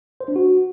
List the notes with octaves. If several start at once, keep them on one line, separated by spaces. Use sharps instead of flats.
C5
D4
F#4